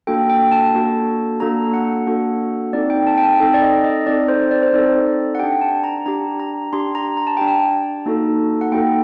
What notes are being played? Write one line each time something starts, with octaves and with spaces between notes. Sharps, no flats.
A#3 D4 F#4 A4 G5
G5
A5
A#3 D4 F#4 A4
A#3 D4 F#4 A4 A#5
F#5
A#3 D4 F#4 A4
C4 D#4 A4 D5
G5
A5
G5
A5
C4 D#4 A4 G5
D5
D#5
D#5
C4 D#4 A4 D5
C5
D5
C5
C4 D#4 A4 D5
F#5
D4 G4 G5
A5
A#5
D4 G4 A#5
A#5
D4 G4 C6
A#5
A#5
A5
D4 G4 G5
A5
A#3 D#4 F#4 A4
F#5
A#3 D#4 F#4 A4 G5